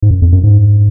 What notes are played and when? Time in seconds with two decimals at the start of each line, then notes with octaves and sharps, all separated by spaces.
0.02 G#2
0.11 F#2
0.22 F2
0.32 F#2
0.43 G#2